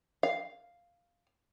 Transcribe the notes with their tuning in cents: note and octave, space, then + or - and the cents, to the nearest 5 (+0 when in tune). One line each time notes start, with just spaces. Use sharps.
F5 +0